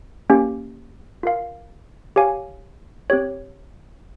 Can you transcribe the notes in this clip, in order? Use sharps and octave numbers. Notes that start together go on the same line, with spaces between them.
A#3 C#4 G4
F4 A#4 F5
G4 C#5 F5 G#5
C4 G4 C#5